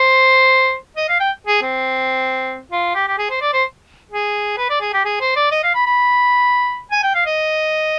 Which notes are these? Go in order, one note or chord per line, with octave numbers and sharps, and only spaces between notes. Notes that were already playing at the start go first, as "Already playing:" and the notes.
Already playing: C5
D#5
F5
G5
G#4
C4
F4
G4
G4
G#4
C5
D5
C5
G#4
B4
D5
G#4
G4
G#4
C5
D5
D#5
F5
B5
B5
G#5
G5
F5
D#5